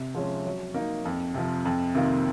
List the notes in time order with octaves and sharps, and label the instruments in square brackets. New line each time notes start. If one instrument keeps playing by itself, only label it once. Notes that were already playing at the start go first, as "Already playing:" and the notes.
Already playing: [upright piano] C3
F3 G#3 C#4
F#3
A#3 D#4
F2
C3 F3
F2
C3 D#3 A#3 F4